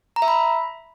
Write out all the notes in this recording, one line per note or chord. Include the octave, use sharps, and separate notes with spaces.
A#5
E5
B5